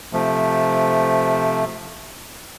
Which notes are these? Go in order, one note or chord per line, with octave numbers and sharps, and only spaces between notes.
C3 F3 A3